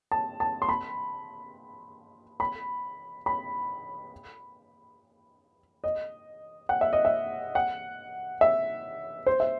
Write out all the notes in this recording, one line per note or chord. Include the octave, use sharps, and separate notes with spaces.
A5
A5
C6
B5
B5
B5
D#5
F#5
E5
D#5
E5
F#5
E5
C5
E5